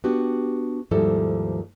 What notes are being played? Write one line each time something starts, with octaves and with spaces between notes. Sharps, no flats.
B3 D4 F#4 G4
D#2 G#2 F3 G3 E4 A4